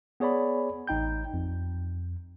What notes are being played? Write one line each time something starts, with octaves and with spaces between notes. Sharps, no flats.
B3 G#4 C#5 D5 B5
A1 D#4 G5 G6
F2